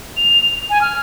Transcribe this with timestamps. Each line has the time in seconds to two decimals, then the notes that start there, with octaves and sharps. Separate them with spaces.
0.17 F7
0.70 G#5
0.81 F6